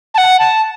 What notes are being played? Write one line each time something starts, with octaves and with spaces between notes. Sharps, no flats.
A5
F#5
A5